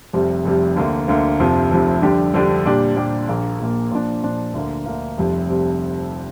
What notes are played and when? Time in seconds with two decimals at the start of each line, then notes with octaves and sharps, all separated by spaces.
0.13 F1 F2 C3 G3
0.45 F1 F2 C3 G3
0.76 D2 D3 A#3
1.08 D2 D3 A#3
1.39 F1 F2 C3 F3
1.71 F1 F2 C3 F3
2.02 F2 D3 G3 D4 G4
2.34 F2 D3 G3 D4 G4
2.65 A#2 G3 D4 G4
2.97 A#2 G3 D4 G4
3.28 A#1 A#2 A#3
3.59 A#1 A#2 A#3
3.91 A#2 F3 D4
4.23 A#2 F3 D4
4.54 D2 D3 A#3
4.86 D2 D3 A#3
5.18 F1 F2 C3 G3
5.49 C3 G3